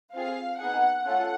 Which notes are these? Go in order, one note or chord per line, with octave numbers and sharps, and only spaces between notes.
C4 F4 G#4 F5
B3 D#4 G#4 F#5
A3 C#4 F4 A4 F#5